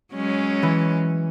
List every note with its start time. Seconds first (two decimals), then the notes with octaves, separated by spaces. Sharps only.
0.14 F#3 G#3 C#4
0.63 E3